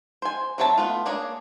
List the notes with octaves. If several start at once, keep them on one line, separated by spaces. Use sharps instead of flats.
C5 G#5
F#3 C4 C#5 E5 A5
A3 B3 F4
A#3 D4 G#4 C#5